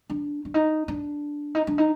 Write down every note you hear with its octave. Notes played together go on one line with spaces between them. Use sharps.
D4
D4
D#4
D4
D#4
D4
D#4